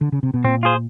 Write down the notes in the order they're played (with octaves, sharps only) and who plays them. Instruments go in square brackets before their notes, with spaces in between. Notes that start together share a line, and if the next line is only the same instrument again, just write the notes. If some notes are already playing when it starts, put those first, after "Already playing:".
[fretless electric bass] D3
C#3
C3
B2
[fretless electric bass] A#2 [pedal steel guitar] C4
[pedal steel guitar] F4 G#4 C5